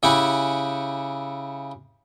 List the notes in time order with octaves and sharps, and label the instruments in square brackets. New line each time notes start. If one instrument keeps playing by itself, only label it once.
[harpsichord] C#3 E4 G4 F#5 G#5